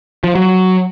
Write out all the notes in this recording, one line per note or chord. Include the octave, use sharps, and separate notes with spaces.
F3
F#3